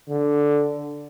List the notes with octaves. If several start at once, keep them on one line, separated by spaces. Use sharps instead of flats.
D3